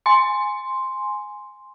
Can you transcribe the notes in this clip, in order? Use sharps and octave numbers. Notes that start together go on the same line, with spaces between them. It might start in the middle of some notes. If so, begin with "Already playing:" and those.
G#5 C6